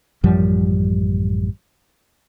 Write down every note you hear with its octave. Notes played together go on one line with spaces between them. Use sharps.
A1 F#2 F3 G3